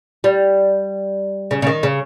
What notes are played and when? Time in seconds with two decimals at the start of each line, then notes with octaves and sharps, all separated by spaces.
0.24 G3
1.51 C#3
1.62 C#3
1.67 D#3
1.83 C#3